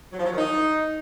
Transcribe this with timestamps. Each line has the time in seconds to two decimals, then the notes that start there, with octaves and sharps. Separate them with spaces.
0.13 F#3
0.19 F3
0.26 F#3
0.32 D#3
0.38 D#4